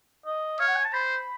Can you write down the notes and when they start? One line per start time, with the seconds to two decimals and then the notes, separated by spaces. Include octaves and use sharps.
0.26 D#5
0.60 C#5 F5
0.68 F#5
0.76 G#5
0.84 A5
0.93 C5 B5